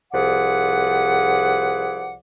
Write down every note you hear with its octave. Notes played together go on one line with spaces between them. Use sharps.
C2 F3 G#4 B4 D5 F#5